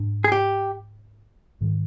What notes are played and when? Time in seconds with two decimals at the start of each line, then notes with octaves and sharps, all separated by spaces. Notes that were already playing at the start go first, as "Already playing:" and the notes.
Already playing: G#2 D4
0.24 G#4
0.32 G4
1.61 G#2 D#3 G3